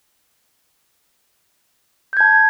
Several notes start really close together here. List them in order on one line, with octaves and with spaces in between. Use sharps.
G6 G#6 A5